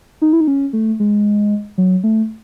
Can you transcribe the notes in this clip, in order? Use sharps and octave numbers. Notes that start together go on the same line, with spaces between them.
D#4
E4
D#4
C#4
A3
G#3
F#3
A3